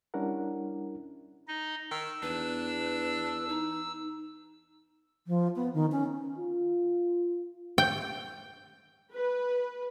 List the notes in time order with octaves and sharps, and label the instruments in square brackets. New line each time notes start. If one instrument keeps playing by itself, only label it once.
[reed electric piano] G3 C#4 D4 E4 A#4 F#5
[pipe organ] D#4 D#5
[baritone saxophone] D#3 [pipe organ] E6
[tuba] E2 [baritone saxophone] D4 [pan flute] B4
[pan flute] D#4
[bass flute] F3
B3
D#3
C#4
[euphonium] F4
[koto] G5
[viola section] B4